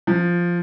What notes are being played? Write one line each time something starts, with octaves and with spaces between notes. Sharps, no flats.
F3